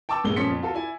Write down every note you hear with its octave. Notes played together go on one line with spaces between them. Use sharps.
G5 A5 C#6 D6 E6
A#1 G2 A#3 G#4 G7
A#2 F3 C#4 C6 B6 C#7
F2
F4 F#4 A4
E4 D5 G#5